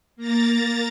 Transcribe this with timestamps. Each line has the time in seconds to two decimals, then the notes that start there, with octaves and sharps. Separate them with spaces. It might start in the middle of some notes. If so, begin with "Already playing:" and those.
0.16 A#3 A#5 A6